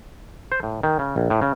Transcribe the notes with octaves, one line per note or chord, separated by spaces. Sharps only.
C5
A2
D#3
C#3
A#1
A2
C#3